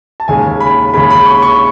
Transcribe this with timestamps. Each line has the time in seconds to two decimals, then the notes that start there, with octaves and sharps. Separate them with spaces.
0.20 A5
0.28 D#2 C#3 G#3 C#4 G#5
0.60 B5
0.93 D#2 C#3 G#3 C#4 B5
1.10 B5
1.26 C#6
1.43 C#6